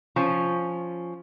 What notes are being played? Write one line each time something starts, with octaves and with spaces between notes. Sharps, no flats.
F3 C#4